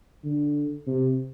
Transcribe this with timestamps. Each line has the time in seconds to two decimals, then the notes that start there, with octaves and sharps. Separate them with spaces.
0.24 D3
0.87 C3